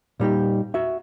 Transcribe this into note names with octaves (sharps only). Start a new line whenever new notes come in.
A#2 G3 D#4 G4
F#4 E5